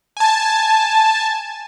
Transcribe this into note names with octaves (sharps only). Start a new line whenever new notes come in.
G#5 A5